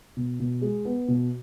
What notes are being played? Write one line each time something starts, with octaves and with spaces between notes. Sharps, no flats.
B2
B2
G#3
B3
B2